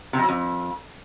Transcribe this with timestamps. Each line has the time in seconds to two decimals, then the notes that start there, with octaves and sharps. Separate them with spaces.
0.13 C3
0.18 F2
0.23 F#3
0.29 F2